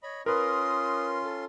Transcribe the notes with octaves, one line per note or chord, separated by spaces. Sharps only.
C#5 D#5 B5
C#4 F4 A#4 B4 C6 D#6
A4